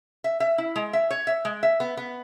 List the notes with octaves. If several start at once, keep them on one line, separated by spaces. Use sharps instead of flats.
E5
E5
E4
G#3
E5
C#5
E5
G#3
E5
B3
B3